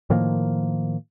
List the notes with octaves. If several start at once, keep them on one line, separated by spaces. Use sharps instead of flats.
A2 D#3 F3 A#3